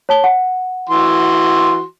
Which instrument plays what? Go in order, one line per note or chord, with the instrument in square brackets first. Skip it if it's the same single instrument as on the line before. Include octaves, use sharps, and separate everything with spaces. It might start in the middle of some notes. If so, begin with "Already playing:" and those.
[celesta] C#5 A5 G7
F#5
[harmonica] E3 F#4 C6